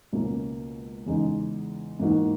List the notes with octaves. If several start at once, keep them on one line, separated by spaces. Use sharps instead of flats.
C#2 B2 A#3 C#4
E2 C#3 G#3 D#4
G#2 E3 A#3 D#4 F#4